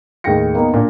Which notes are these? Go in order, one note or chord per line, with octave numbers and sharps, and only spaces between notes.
D#2 A2 G#4 G5 A#6 C#7
A#3 B3 D#4
A#2 D4